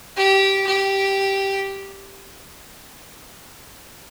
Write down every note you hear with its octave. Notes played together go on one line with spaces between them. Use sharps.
G4
G4